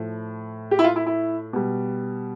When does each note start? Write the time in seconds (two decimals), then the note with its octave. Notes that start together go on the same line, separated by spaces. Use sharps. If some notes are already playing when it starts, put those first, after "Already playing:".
Already playing: A2 F3
0.71 G4
0.79 E4
0.84 F4
0.96 E4
1.06 E4
1.53 B2 G3